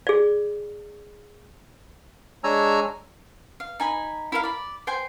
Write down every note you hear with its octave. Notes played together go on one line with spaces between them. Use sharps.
G#4 D5
G#3 D4 C#5 G#5 A#5 E6
F5
D#4 G#5 B5
E4 A#4 F5
D5 B5
C5 G5 G#5 C6